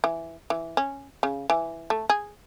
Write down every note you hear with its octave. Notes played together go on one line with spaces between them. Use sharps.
E3
E3
C#4
C#3
E3
A3
G#4